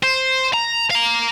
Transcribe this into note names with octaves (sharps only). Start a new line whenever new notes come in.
C5
A#5
F5 A#5